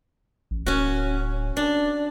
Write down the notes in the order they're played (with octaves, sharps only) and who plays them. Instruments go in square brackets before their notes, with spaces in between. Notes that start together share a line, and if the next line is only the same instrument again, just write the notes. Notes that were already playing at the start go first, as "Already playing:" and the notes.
[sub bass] A1
[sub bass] D1 [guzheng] C#4 F#4
[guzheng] D4